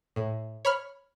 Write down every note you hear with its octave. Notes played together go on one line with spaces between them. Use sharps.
A2
C#5 B5 F6